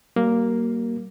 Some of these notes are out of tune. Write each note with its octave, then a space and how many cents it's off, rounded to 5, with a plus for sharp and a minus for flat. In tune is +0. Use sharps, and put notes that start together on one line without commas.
G3 -45 A#3 +0